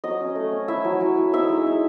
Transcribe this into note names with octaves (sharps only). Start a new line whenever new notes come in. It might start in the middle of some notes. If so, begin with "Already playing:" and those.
F#3 D#5
C#4
A3
C#4
E4 E5
F#3
F#3
E4
D#4 E5
G#3
D#4